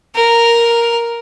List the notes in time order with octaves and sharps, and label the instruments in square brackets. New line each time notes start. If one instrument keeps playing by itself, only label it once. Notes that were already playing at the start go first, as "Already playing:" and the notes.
[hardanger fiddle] A#4